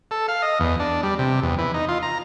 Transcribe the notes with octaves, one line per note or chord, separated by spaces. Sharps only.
A4
F5
D#5
E2
D4
G3
C3
E2
E3
D#4
F4
A#5